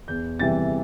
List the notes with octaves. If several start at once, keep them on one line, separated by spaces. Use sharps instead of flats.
E2 G6
C3 E3 G3 A6